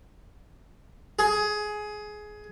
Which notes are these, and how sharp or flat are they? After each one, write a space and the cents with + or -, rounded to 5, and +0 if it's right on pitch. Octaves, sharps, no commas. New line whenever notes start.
G#4 +15